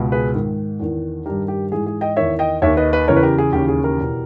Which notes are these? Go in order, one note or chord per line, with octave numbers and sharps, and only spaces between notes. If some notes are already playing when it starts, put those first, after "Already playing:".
Already playing: C#2 B2
G#4 B4
G#2 D#3
E2 D#3
G2 D#3 G4 A#4
G4
G#2 E3 G#4
G#4
D#5 G5
E2 D#3 C#5 E5
D#5 G5
D#2 D#3 C#5 E5
B4 D#5
B4 D#5
E2 C#3 E3 A#4 C#5
B4
G4 A#4
G#4
D#2 C#3 E3 G4
G#4
G4 A#4
E2 B2